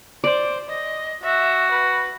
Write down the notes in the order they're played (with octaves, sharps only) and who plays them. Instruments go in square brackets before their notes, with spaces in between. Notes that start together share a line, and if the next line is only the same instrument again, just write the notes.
[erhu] C5 [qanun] D5
[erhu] D#5
[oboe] F#4 [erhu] E5
[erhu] B4